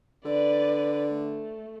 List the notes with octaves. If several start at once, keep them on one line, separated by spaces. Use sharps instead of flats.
D3 B4 D5
A3